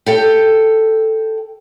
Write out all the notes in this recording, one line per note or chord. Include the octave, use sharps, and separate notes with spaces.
G4 A4 G5